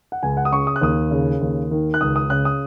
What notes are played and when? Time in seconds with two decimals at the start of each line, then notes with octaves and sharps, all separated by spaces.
0.12 F#5
0.23 C#2 G#5
0.37 F#5
0.45 D#6
0.52 C#3 C#6
0.67 D#6
0.76 F#6
0.81 D#2 D#6
1.11 C#3
1.41 D#2
1.71 D#3
1.94 F#6
2.01 C#2 D#6
2.16 D#6
2.30 C#3 F#6
2.45 D#6